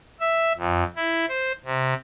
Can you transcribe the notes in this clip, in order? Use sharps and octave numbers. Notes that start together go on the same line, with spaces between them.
E5
F2
E4
C5
C3